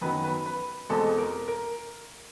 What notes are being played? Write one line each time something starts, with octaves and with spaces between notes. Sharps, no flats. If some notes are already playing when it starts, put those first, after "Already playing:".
F#2 D#3 F#3 B3 B4
B4
B4
E2 B2 G#3 C4 A4
A#4
A#4